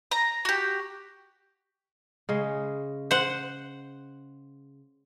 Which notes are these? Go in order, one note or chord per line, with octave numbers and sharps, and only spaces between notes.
A#5
F#4 G4
C#3 G#3
C5 F#5